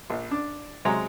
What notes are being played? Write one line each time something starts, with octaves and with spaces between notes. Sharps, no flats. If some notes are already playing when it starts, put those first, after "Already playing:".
A#1
D4
C3 F#3 G#3 A#5